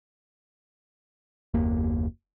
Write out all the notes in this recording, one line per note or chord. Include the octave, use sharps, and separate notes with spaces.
F#1 D#2 A#3